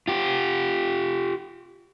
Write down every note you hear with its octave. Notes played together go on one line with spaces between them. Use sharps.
F4 G4